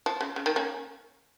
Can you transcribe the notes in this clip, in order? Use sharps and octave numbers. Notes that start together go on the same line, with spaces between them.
F3
C#3
C#3
D#3
A#3 C#4